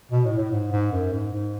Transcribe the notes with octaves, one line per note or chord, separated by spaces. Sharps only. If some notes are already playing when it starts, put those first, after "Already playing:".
B2
A2
A2
G#2
G#2
F#2
G#2
G#2